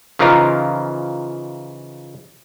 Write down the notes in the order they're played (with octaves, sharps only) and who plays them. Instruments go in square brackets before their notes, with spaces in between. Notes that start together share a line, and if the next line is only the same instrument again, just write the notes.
[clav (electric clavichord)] C#3 E3 F3 D#4 F4 A#4